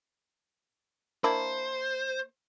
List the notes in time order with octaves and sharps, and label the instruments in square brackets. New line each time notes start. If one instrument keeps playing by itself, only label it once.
[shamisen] A#3 D4 E4 [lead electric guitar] C5